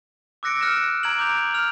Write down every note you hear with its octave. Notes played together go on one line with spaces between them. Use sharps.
D6 E6 F#6 A#6 C#7 D7
F6 F#6 A#6 C#7 E7
A#5 G#6 D7 F#7
D6 G6 F7
F6 F7